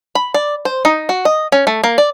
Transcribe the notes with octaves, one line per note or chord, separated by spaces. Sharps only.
B5
D5
C5
D#4
F#4
D#5
C#4
A3
A#3
D5